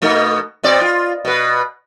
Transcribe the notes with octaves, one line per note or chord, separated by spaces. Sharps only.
B2 A3 D#4
B2 C4 D5
F4
B2 B4